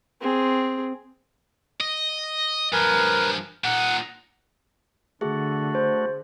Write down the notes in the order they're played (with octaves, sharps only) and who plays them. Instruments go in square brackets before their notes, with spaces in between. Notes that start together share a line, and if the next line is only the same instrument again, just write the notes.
[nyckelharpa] C4 G#4
[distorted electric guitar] D#5
[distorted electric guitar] G2 F3 [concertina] A#4 B4 G#5
[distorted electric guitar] A#2 D#4 [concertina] F#5
[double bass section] D3 [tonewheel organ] A3 F#4 [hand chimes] G#4
[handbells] C5